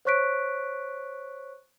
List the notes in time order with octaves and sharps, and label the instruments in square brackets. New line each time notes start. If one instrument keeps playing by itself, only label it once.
[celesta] C5 C#5 C#6 F#6 B6 D7